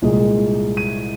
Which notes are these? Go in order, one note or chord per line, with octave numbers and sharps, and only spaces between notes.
C2 A#2 G#3
D#7